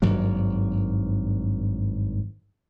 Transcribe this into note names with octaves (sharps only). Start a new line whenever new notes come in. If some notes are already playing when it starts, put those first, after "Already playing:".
G#1 G2 F#3 A#3